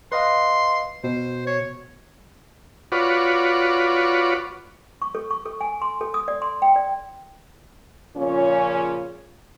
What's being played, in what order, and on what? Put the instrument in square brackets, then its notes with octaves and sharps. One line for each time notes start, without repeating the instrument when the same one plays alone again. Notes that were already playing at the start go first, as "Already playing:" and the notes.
[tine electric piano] B4 D#5 F5 [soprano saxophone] C6
[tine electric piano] B2 [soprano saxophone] C5
[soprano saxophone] C#5
[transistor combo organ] F4 F#4 B4 C#5 D5
[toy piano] C#6
A4
C#6
A4
G#5
C6
A4
D#6
D5
C6
G5
D5
[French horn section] A#2 C#3 F3 C#4